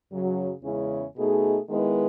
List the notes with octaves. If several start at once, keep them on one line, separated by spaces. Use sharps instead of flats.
F#2 C#3 F#3
E2 C#3 G#3 C#4 E4
B2 A3 D#4 G#4
D#3 G#3 B3 E4 B4